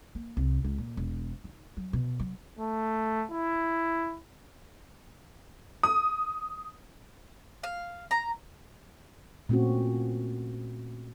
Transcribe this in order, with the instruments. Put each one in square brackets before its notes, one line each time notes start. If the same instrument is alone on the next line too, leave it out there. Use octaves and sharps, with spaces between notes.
[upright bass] A#3
C2
C#2
A#2
E1
D#3
F#3
B2
F#3
[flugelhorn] A3
E4
[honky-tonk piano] D#6
[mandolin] F5
A#5
[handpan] A#2 A3 C4 C#4 F#4